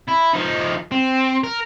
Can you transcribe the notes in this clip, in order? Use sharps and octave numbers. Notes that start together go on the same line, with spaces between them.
E4
F3 D#4
C4
A#4